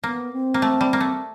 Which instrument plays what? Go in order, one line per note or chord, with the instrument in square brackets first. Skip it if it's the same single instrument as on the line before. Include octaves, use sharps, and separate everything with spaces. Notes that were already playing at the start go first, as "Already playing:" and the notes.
[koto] A#3 [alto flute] B3
[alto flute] C4
[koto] A#3
A3
G3
A#3
A3